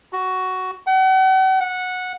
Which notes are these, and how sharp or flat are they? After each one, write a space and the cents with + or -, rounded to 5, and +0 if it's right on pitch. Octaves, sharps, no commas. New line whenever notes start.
F#4 +10
F#5 +40
F#5 -15